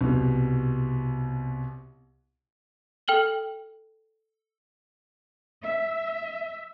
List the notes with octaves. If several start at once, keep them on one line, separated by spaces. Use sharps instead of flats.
C2 B2
A4 G5 F6 F#7 G7
E5